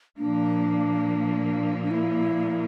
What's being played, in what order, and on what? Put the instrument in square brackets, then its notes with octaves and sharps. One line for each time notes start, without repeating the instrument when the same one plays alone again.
[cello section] A#2 F3 A#3 [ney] D4
[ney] D4
E4